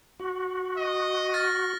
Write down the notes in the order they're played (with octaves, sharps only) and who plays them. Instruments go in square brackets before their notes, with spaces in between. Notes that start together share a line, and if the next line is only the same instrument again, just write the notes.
[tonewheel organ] F#4
[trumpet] D#5
[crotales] F6 A6 A#6